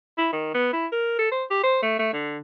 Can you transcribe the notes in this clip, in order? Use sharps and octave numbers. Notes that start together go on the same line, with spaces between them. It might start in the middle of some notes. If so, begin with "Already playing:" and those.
E4
D#3
B3
E4
A#4
A4
C5
G4
C5
A3
A3
D3